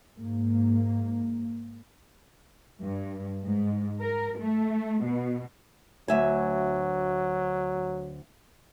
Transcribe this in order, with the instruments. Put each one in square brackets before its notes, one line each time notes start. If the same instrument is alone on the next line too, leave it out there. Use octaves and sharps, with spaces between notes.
[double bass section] G#2 A#3
[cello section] G2
G#2
A#4
A3
B2
[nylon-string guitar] D2 E5 G#5 [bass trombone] F#3